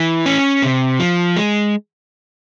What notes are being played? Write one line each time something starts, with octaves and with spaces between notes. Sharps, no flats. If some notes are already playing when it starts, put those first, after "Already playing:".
Already playing: E3
C#4
C3
F3
G#3